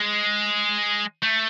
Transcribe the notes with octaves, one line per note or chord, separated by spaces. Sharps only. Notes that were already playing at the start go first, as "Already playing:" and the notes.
Already playing: G#3
A3